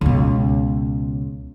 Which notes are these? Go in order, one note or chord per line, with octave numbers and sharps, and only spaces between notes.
C#2 B2